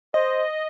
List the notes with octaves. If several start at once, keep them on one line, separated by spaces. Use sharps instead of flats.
C5 D#5